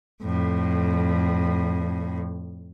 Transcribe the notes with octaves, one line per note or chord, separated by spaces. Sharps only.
F2 A2